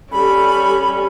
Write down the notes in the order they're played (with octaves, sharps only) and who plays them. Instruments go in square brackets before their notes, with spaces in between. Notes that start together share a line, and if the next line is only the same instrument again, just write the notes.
[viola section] G3 A4 [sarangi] C#4 [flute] B5